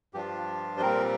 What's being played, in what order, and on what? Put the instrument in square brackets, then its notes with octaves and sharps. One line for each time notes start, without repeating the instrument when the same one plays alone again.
[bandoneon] G2 F3 D4 F4 G4
C5
A#2 G3 C4 A#4